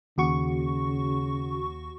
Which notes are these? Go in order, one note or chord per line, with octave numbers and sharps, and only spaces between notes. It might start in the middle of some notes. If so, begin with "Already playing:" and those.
D#2 C#3 F#4 C#6